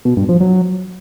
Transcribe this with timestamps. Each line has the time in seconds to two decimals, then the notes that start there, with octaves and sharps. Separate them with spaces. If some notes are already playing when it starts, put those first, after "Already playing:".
0.05 B2
0.17 G2
0.29 F3
0.41 F#3